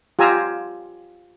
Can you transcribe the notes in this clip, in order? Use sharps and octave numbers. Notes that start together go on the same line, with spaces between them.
F4 G4 G#5 A#5 E6